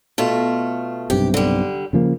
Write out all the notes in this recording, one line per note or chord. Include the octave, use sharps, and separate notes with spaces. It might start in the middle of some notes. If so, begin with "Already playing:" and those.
B2 A3 F4
B1 G2 C3 G4
D3 G3
C#3 F3 A#3